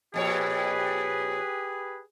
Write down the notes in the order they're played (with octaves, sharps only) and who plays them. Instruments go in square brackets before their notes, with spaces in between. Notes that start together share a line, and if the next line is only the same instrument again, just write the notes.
[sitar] F2 A#2 C#5 [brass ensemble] G4 B4 [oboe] G#4